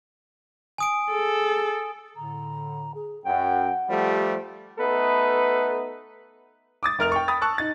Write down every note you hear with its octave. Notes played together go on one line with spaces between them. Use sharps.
G#5 D#6 D7
G#4 A4
A2 D3 A#5
G#4
F#2 F#5 G5
F3 G3 A3 G4
A3 B3 D#4 A4 B4
D6 D#6 A6
F1 A#4 F6 F7
G5 C#6
G5 B5 D#6 A6
A5 C#6 E6 F#6
D#4 A6